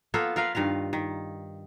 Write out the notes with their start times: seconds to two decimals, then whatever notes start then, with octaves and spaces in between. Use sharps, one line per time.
0.14 A#3 B3 F4 A4
0.36 F4 A#4 B4 F5
0.55 G2 D#3 F4 F5
0.93 D#3